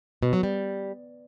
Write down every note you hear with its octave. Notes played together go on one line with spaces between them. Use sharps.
B2
F#3
G3